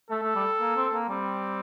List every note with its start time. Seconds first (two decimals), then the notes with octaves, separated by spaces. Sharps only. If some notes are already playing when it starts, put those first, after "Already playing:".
0.11 A3 A4
0.23 A3
0.35 G3
0.60 A#3
0.76 C4
0.93 A#3
1.09 G3 C4